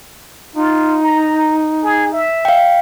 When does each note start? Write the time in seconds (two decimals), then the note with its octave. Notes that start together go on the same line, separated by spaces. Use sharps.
0.56 D#4 F4
1.03 A#5
1.84 G#4
2.13 E5
2.45 F5 G5